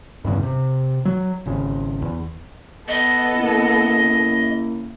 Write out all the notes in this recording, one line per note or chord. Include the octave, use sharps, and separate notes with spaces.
E2 G2 C#3
C3
F#3
G#1 C#3
E2
B3 A4 D#5
C#3 A#3 E4